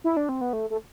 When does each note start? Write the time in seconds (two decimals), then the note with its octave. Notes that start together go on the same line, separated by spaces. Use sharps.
0.04 E4
0.17 D4
0.29 C4
0.41 B3
0.53 A3
0.70 A3